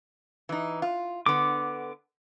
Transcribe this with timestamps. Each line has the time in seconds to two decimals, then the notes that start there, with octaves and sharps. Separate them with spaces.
0.49 E3 D#4
0.82 F4
1.26 D3 B3 D6